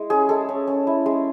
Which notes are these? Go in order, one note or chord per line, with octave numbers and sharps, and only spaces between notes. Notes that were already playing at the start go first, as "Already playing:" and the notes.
Already playing: G#3 E4
C#4 G#4
G#3 A4
C#4
C#4
E4
G#3